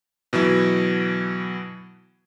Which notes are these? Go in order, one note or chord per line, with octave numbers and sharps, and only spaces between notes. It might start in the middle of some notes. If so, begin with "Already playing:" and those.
B2 E3 F#3 E4